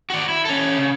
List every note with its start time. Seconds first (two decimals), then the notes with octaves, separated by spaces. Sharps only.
0.10 F#4 D5
0.29 E4
0.45 C#4 A4
0.79 C#3